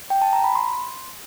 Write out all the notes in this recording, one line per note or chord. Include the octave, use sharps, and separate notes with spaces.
G5
A5
A#5
B5
C6